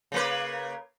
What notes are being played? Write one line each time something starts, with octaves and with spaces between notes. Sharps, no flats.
C#3 A#3 B4